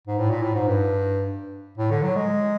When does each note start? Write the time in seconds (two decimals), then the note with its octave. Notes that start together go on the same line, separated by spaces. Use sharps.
0.07 G#2
0.19 A2
0.31 A#2
0.43 A2
0.55 G#2
0.68 G2
1.78 A2
1.91 D3
2.03 F#3
2.16 G#3